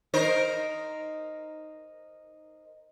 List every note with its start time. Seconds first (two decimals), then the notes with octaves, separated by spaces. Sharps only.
0.14 D#4 A#4 C5